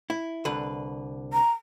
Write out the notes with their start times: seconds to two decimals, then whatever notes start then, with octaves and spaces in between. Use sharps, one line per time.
0.10 E4
0.45 C2 D3 B4
1.33 A#5